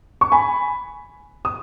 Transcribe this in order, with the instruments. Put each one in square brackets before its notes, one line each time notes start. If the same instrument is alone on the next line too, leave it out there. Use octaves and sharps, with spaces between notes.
[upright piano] C#6
G#5 B5
D#6